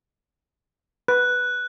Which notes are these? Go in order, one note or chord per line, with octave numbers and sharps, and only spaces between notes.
B4 F#6